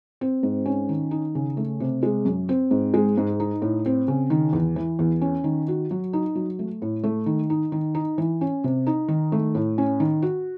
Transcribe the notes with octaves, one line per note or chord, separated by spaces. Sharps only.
C4
G#2
C#4
D#3
D#4
C#3
A3
C3
G#3
F#2
C4
G#2
G#3
G#2
D#4
A2
C4
C#3
D#3
E2
E3
E2
C#4
D#3
F#4
F#3
D#4
F#3
A3
A2
A3
D#3
D#4
D#3
D#4
E3
C#4
C3
D#4
D#3
A3
A2
C#4
D#3
F#4